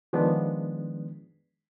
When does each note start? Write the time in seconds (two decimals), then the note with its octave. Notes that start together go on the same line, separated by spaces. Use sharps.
0.13 D#3 F3 G#3 B3 D4